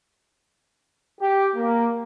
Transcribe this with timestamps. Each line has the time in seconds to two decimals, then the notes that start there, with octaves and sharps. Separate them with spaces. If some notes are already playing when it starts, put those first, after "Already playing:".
1.21 G4
1.55 A#3